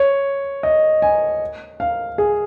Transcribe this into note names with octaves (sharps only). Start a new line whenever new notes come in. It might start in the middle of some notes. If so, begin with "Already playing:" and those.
Already playing: C#5
D#5
G#5
F5
G#4